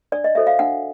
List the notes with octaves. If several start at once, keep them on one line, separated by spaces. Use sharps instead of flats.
D4 D5
D#5
F#4 A4 C5 E5
F5
D4 F#5